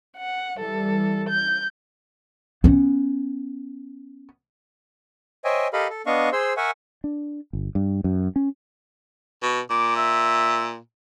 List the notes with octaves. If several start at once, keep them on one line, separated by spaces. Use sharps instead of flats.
F#5
E3 G3 A4
G6
B3 C#4
C5 C#5 D#5 E5 G5 G#5
G4 A4 A#4 D#5 F5 B5
A4
B3 D4 D#5 F5 C#6
G#4 C5 C6 E6
A#4 E5 F#5 G#5 C#6
D4
G1
G2
F#2
C#4
B2
A#2 D6
E5